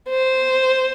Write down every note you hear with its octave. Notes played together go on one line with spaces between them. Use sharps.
C5